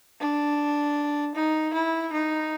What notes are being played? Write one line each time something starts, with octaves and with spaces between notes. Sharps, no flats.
D4
D#4
E4
D#4